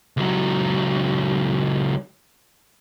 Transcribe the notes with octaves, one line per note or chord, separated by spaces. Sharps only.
C#2 F#3